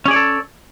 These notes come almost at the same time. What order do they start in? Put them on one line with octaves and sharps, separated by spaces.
C#4 G#4 D5 C#5 A4